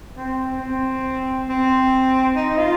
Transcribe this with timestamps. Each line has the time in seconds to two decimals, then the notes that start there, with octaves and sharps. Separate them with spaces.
0.17 C4
0.61 C4
1.49 C4
2.36 D#4
2.58 F4